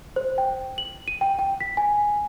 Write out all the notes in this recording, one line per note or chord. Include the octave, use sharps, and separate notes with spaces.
C5
G5
F#7
D#7
G5
G5
B6
G#5